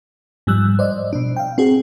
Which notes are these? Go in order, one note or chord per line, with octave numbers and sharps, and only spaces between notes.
G#2 F3 G3 E6 F#6
C5 D5 D#5
B2 D4
F5 G5
C4 F#4 G#4